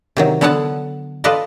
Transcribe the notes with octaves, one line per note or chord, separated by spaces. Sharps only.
C3 D#3 F#3
D3 B3 A4 C#5 F#5 A5
F4 A4 B4 D5 D#5